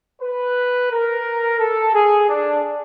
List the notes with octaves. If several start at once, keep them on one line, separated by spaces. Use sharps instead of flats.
B4
A#4
A4
G#4
D4